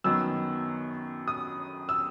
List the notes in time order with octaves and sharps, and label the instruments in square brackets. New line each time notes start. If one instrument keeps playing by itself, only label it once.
[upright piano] F#2 D#3 F#3 B3 E6
D#6
E6